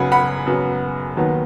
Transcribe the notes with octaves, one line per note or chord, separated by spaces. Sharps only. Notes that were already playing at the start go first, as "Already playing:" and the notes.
Already playing: F#2 C#3 F#3 B3 F#5 G#5 B5
F#5 B5
F#2 C#3 F#3 B3
D#2 D#3 F#3 B3